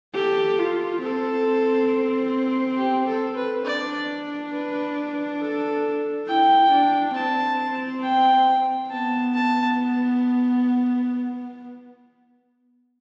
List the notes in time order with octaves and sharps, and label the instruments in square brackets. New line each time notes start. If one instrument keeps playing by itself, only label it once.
[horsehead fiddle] G4 [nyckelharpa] A4
[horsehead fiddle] F4
[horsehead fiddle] C4 [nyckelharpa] A4
[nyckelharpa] G4
A4
B4
[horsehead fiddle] D4 [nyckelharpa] D5
[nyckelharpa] B4
A4
[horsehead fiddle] E4 [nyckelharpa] G5
[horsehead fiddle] D4
[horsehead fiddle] C4 [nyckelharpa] A5
[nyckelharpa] G5
[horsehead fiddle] B3 [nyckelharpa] A5
[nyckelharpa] A5